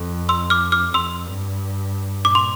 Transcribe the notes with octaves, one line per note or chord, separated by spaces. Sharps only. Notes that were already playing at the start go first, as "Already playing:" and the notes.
Already playing: F2
C6 E6
D6 F6
D6 F6
F2 C6 E6
G2
A#2 D6
C6